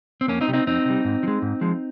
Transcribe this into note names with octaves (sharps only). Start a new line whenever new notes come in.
C4
F2 A#3 C#4
C4 D#4
C3 G3
C4 D#4
F2 C4 D#4
C3 G3
G#2
F3
G#3
G#2
F3 G#3